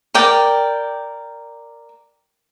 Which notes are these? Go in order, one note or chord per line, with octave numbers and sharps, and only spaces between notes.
A#4 D5 G5